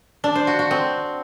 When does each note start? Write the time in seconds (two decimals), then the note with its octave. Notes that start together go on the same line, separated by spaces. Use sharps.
0.24 D4
0.35 C5
0.47 F#4
0.59 F#4
0.71 C4